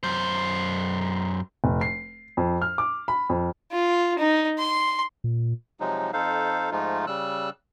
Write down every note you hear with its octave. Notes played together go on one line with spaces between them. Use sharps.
F#2 C5
F1
C7
F2
F6
D6
B5
F2
F4
D#4
C6
A#2
C3 F3 F#3 G#3 D#4
F2 D#4 A4 C5 F5
G#2 F3 G#3 A3 D#4 F4
C#3 G3 E6 F#6